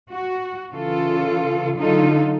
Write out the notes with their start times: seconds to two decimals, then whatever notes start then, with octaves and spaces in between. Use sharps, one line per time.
0.10 F#4
0.71 C#3 E3 F4 A4
1.77 D3 F#3 D#4 F4 A4